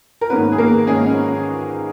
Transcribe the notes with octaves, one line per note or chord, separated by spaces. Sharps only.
A#4
G#2 D#3 A#3 B3 C#4 B4
G#4
A#3 A#4
G#2 D#3 G#3 A#3 C#4 G#4
C#4